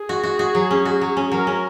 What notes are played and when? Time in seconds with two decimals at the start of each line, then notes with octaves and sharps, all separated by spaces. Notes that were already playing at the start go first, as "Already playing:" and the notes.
Already playing: G#4
0.09 F#4
0.23 F#4
0.39 F#4
0.55 F#3
0.71 C#4
0.85 F#4
1.01 F#3
1.17 C#4
1.32 F#3 A#4
1.47 C#4